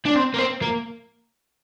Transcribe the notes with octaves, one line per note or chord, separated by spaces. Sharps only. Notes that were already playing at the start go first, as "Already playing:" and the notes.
D4
C4
A#3
C4
A#3